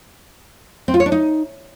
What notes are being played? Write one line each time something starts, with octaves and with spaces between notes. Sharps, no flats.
C4
F4
C#5
D4
D#4